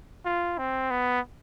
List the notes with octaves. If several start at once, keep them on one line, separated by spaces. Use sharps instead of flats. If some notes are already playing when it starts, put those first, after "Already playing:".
F4
C4
B3